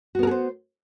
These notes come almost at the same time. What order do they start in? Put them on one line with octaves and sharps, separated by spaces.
F#4 B3 A#4 G#4 C5